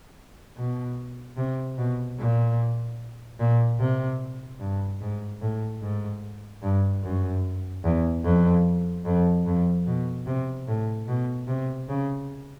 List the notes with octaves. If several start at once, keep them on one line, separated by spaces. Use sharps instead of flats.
B2
C3
B2
A#2
A#2
C3
G2
G#2
A2
G#2
G2
F#2
E2
F2
F2
F2
B2
C3
A2
B2
C3
C#3